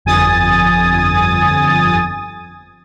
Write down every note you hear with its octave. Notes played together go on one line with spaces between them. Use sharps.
G1 F2 G#5 D#6 A6